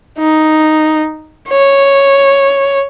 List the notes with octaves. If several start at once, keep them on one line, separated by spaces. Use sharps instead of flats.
D#4
C#5